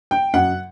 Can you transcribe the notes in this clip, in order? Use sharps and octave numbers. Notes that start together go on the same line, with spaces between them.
G5
F#2 F#5